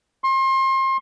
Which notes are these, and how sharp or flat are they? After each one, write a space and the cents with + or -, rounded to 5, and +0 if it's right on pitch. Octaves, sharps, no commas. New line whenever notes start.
C6 +35